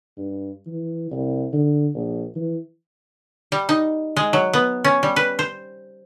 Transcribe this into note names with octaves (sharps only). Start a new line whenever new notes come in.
G2
E3
C2
D3
A#1
E3
G3
D#4
G#3
F#3
B3
C#4
G3
B4
C5